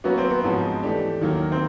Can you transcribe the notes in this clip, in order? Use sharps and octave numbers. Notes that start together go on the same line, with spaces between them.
F#3 A#3 B3 C#4 F#4
C4
B3
G#2 F3 G#3 C#4 F#4
E3 A3 D4 G4
D#2 D#3 F#3 A#3
C4